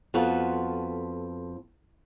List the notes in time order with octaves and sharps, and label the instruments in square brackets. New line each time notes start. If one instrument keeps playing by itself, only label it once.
[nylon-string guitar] F2 B3 F4 F#4 A4